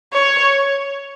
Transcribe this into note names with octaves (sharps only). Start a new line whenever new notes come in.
C#5